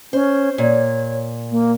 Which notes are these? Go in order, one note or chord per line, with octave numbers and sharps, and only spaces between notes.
C#4 C5
A#2 C#5
A#3